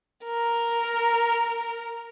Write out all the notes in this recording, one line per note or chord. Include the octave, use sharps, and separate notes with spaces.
A#4